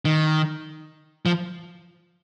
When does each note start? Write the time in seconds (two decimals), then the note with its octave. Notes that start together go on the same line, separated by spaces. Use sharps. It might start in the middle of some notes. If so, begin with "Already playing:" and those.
0.05 D#3
1.26 F3